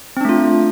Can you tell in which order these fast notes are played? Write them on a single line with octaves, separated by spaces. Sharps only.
C4 D4 A3 F4